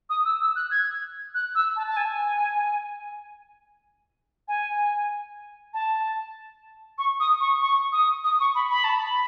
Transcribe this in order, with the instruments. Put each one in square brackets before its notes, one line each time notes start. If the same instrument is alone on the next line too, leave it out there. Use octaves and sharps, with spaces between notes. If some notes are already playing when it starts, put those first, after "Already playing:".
[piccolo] D#6
E6
E6
F#6
G#6
F#6
E6
A5
A5
G#5
G#5
A5
C#6
D#6
C#6
C#6
D#6
D#6
C#6
B5
B5
A5
B5